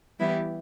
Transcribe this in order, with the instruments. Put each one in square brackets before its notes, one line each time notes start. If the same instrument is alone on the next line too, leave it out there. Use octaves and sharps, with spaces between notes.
[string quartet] E3 G3 B3 E4 G4